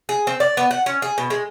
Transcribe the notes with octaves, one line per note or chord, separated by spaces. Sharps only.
G#4
C4
D5
B3
F#5
C#4
G#4
B2
G#3